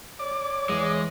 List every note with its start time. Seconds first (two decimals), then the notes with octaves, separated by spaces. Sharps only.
0.19 C#5 D5
0.69 E2 G#3